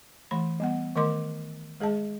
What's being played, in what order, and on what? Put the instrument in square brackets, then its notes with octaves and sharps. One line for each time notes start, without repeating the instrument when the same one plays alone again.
[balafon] E3 A3 B5
G3 B3 F#5
D#3 A3 A#4 D#5 C6 D6
G#3 G#4 D#5 A5